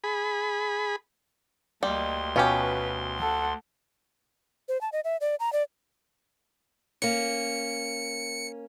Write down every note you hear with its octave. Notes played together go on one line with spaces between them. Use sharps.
G#4 B5
D2 G3 A#3 D#5 C6
B2 C#4 F4 G4 B4
A4 F#5
C5
A5
D#5
E5
D5
A#5
D5
A#3 C#4 C#7